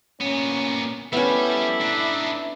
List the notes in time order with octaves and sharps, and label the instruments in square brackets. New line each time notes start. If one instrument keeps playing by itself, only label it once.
[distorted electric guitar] A#2 B3 [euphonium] C#4
[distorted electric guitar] G3 [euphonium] A3 [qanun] B3 C#4 [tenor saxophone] E4
[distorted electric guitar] D4 D#4